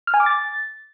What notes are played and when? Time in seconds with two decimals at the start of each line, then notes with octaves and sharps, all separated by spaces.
0.07 F6
0.14 G#5
0.20 D6
0.26 A6